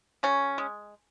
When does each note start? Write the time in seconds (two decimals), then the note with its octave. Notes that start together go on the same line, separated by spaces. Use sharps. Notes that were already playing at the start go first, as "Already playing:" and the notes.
0.23 C#3 C#4
0.58 G#3